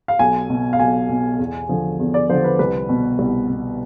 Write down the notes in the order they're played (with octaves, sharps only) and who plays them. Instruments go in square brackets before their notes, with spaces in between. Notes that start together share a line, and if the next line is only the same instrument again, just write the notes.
[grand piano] F5
B1 G#5
B2
F5
B1 G#5
B2
E2
D3 F3
E2
D5
D3 F3 C5
B4
C2 B4
B2
C2
B2